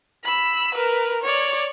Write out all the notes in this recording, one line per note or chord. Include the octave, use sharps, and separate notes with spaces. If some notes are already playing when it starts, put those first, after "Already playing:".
B5 E6
A#4 B4
C#5 D5